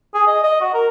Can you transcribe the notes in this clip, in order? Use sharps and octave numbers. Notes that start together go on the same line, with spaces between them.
G#4
D#5
D#5
F#4
A#4